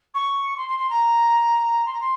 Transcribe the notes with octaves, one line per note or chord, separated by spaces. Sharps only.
C#6
C6
C6
C6
A#5
C6
A#5
C6